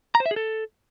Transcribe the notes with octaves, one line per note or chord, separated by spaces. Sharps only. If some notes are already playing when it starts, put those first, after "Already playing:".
A#5
C5
E5
G#4
A4